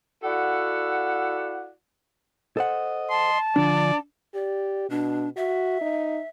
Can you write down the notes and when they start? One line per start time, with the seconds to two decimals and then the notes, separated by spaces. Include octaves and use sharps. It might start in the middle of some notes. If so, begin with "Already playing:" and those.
0.23 E4 F#4 A4 D5 F5 F#5
2.57 A4 C5 D#5 F#5
3.10 A5 C6
3.56 D3 F3 D4 D5
4.35 G4 D5
4.90 B2 D4
5.37 F#4 E5
5.81 D#4